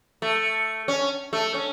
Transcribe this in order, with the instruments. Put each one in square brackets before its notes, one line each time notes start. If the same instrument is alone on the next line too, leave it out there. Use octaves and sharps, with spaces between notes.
[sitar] A3
C#4
A3
C#4